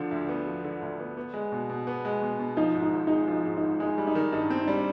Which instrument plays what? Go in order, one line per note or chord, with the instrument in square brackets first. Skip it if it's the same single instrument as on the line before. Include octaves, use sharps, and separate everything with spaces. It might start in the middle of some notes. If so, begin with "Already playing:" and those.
Already playing: [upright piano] D3 F3 [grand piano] D4
[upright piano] D2
B3
F3
D3
D2
B3
B3
G#3
B2
B2
B3
G#3
B2
B2
[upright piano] F3 [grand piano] D#4
[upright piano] G#2
[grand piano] D#4
[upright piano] G#1
[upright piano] G#3 [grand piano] D#4
[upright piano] F3 [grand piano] D#4
[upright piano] G#2
[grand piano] D#4
[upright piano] G#1
[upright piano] G#3 [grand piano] D#4
[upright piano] G3
[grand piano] D#4
[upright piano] D#3
[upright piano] G2 [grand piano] D#4
[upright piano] C4
[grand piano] D#4
[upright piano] G3 [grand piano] D4